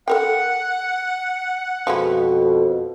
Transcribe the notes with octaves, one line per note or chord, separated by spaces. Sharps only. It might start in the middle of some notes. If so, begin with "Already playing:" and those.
A4 A#4 F#5 G5
F2 B2 F3 G#3 E4